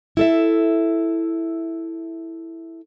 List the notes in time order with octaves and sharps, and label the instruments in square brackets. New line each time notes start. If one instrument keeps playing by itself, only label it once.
[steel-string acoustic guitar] E4 A4 E5